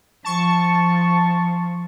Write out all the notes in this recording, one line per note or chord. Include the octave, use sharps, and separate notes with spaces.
F3 A5 C#6